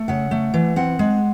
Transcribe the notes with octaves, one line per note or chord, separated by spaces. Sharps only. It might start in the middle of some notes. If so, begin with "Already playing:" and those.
Already playing: A3
C#3 F#5
A3
E3
C4 F#5
G#3